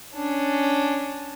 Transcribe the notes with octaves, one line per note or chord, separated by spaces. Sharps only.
C#4 D4